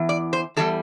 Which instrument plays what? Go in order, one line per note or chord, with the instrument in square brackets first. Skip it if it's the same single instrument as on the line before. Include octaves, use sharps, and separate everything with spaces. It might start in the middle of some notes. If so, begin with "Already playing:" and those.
Already playing: [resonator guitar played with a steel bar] E2 E3
D5
C5
E2 E3 G3 A4